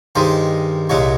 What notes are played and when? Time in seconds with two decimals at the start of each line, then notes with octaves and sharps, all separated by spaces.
0.15 G2 D#3 G#3 C5
0.89 C2 A#2 G#3 C#5